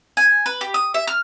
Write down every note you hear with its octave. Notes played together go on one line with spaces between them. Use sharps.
G#5
B4
G4
D#6
E5
F6